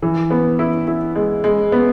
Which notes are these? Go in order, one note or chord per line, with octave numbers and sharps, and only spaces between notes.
E3
B3
E4
E4
G#3
G#3
B3